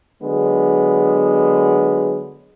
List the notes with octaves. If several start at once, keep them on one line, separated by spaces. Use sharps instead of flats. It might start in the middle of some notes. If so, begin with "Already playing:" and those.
D3 F#3 G#3 B3